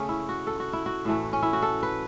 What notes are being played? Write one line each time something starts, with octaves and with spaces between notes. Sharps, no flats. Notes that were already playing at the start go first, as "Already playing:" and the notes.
Already playing: C#3 A3 C#4
E4
F#4
A4
F#4
E4
F#4
A2 E3 A3
C#4
E4
F#4
A4
B4